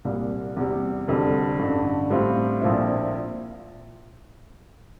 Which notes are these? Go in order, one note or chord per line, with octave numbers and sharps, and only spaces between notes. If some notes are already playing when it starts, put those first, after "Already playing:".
C2 A#2 G3
E2 C3 G3
F1 F2 D3 G3 D4
A1 G2 D3
A2 G3 C4 F4
A#1 A#2 F3 C4 E4